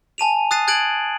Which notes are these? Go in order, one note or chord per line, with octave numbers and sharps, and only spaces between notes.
G#5 A5 D#7 F7
D#6 F#6 A6 C7 D#7
F#6 G#6 A6 D7 F#7